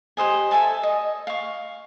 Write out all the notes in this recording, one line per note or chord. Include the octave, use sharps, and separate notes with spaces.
G4 C5 D#5 G#5
A4 E5 G#5 A5
D#5
F5 C#6